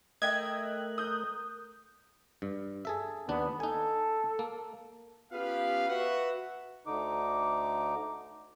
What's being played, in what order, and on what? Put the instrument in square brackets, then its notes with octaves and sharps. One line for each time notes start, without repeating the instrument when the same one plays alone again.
[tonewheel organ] A3 A#4 F#6 [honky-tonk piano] D#5 E5 G5 [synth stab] G#6
[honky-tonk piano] D#6 G6
[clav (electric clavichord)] G2
G#4 A4 E5
[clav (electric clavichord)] D#2 D4 [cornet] B3
[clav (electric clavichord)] D#4 G#5 [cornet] A4
[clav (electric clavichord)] A#3
[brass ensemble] B3 C#4 F4 G4 B4 F5
F#4 B4 E5 F#5
[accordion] D2 D3 D#4 D6